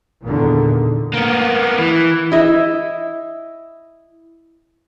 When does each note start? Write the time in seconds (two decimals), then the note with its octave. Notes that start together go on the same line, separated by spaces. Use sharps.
0.24 E2 A#2 D3 D#3
1.14 A#3 B3
1.78 E3
2.32 E4 D#5 E5